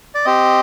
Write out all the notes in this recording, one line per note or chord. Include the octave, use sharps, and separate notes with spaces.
D5
C4 G4 D#5